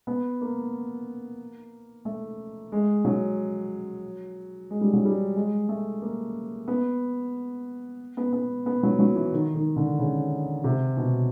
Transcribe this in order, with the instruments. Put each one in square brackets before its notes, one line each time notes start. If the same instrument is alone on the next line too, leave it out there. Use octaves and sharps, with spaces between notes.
[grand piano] B3
A#3
A3
G#3
F#3
G#3
G3
F#3
G3
G#3
A3
A#3
B3
B3
B3
B3
F#3
F#3
E3
D#3
D#3
D3
C#3
C3
B2